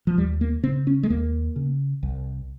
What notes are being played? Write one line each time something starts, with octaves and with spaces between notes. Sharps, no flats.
F3
D#2 G3
A#3
C#3 C4
C#4
G#3
D#2 A#3
C#3
C2